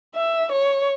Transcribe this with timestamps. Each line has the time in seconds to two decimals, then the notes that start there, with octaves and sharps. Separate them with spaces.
0.15 E5
0.52 C#5